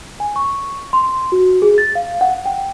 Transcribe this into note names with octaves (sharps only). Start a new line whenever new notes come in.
G#5
C#6
C6
F#4
G#4
A6
F5
F#5
G5